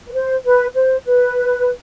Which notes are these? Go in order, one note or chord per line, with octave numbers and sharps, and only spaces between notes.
B4
C5
B4
C5
B4